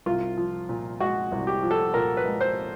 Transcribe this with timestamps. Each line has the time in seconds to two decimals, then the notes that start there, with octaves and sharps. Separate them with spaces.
0.06 C2 F4
0.38 F3
0.69 A#2
1.00 G#3 F#4
1.32 C2
1.47 G4
1.63 F3
1.71 A4
1.94 A#2 A#4
2.17 B4
2.25 G#3
2.41 C5